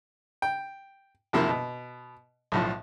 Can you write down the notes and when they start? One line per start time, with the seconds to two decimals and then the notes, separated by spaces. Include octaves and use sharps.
0.42 G5
1.33 F#2 C3 D#3 F3 A#3 E4
1.49 B2
2.52 B1 A2 F3